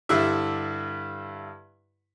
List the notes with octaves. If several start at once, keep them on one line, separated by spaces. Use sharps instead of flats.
G2 D3 E4 E5